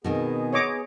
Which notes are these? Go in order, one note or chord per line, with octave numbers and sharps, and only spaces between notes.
B2 D#3 B3 C4 G#4
C#5 D#5 D6